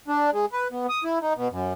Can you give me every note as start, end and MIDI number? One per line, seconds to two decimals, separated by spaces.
0.08 0.30 62
0.33 0.46 56
0.52 0.68 71
0.72 0.87 59
0.89 1.04 87
1.04 1.19 64
1.22 1.33 63
1.36 1.48 47
1.51 1.73 42